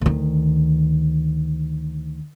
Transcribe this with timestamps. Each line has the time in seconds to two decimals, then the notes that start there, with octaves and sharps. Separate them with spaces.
0.01 D2 D#3